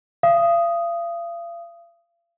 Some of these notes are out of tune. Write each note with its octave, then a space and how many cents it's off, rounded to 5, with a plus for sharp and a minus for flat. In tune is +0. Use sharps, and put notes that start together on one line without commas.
F5 -40 D#6 +0